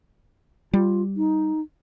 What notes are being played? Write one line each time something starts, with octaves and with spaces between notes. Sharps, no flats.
G3 F4
D#4